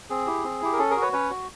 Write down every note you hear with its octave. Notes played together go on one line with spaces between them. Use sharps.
C4 G#4
E4 G4
C4
E4 G4
A#4
C#4 A4
G#4 A#4
F#4
B4 C#5
C#4 B4 C#5
F#4